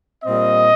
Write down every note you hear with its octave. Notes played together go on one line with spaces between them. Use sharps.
A#2 G3 C4 D#5